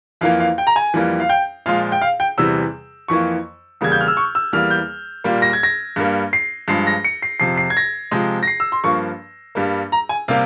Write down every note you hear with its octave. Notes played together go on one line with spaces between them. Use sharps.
F2 E3 A#3 F5
F5
G5
A#5
G#5
F2 E3 G3 A#3
F5
G5
A#2 F3 G#3 F5
G5
F5
G5
E2 C3 E3 G3 E6
F2 E3 A#3 C#6
E2 C#3 G3 A#3 G#6
G6
F6
E6
C#6
E6
E2 E3 G3 A#3 F6
G6
A#2 G3 A#3
A#6
G#6
A#6
G2 G3 A#3
C7
G2 F3 G#3 C7
A#6
C#7
C7
F2 C3 F3 C7
C7
G#6
A#6
C3 F3 G#3
A#6
C7
E6
C6
G2 F3 A#3 C#6
G2 G3 A#3
A#5
G#5
C3 G3 A#3 F5